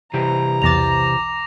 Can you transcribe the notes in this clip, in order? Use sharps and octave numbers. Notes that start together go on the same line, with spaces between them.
C3 E3 G4 A#5
B1 E2 D6 A6 A#6 F7